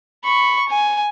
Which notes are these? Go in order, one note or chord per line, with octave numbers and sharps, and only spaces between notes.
B5 C#6
G#5